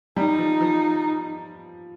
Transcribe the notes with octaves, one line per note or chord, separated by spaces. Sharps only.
G3 D#4
F3
F3